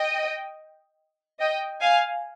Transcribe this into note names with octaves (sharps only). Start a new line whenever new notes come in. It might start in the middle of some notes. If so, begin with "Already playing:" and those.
Already playing: D#5 G5
D#5 G5
F5 G#5